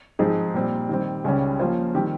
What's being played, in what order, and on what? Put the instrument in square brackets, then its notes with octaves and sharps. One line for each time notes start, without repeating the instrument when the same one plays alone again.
[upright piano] G#2 F3 C4 D#4 G#4
A#2 G3 C4
D#3 G3 C4
C#2 C#3 G3 C#4
F3 A#3 C#4 F4 C5
D#3 G3 C4 G4